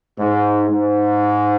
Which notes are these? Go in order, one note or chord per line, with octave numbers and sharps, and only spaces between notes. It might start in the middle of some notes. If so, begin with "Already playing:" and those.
G#2
G#2